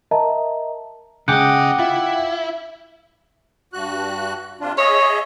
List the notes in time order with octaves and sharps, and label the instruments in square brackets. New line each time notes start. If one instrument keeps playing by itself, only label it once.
[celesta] A#4 D#5 E5 A5 A#5
[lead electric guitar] E2 D#5 [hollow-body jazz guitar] C#3 G#3 [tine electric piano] F#5 G5 D6
[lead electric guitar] E4 [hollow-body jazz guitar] F4
[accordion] G2 F#4 F#6
C3 D4 F4
[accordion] G#4 D#5 E5 [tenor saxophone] C#5